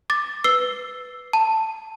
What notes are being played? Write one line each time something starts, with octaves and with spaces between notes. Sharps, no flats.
D6 A6
B4 E6 C7 G7
A5